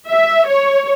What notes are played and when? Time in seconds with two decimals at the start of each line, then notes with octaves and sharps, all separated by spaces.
0.08 E5
0.48 C#5